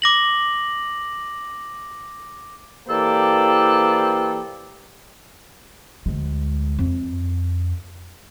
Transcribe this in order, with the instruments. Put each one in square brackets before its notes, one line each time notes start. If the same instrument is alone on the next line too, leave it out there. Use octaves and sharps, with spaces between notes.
[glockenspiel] D6 A#6 F#7
[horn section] E3 A#3 G4 A4 C5 D5
[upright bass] D2 G#3
F2